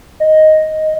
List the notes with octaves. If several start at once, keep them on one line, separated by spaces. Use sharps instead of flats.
D#5